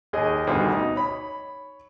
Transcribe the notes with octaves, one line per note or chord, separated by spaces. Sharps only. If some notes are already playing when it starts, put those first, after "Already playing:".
D#2 G#4 D#5
D2 G2 B2 D#3
D#4
C#5 B5